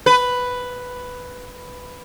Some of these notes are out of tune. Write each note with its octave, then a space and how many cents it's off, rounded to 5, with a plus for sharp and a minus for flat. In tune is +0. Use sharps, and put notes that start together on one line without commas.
B4 +5